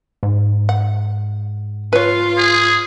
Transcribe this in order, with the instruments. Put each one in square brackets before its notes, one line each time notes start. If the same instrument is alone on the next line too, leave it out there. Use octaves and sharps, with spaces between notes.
[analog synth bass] G#2
[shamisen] F#5
[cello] F4 [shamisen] B4 C#5
[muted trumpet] G#4